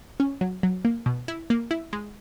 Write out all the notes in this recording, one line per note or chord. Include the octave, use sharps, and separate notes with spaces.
C#4
F#3
F#3
A#3
B2
E4
A#3
E4
G#3